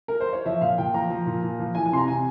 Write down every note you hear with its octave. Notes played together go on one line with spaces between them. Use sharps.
A#4
C5
C#5
F3 E5
A#2 F5
A#2 G5
F3 A#5
F3
A#2
A#2
F3
E3 G#5
G#5
C3 A#5 C6
C3 G#5